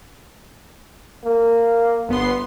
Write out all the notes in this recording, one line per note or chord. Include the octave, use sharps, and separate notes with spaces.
A#3
G1 B3 C6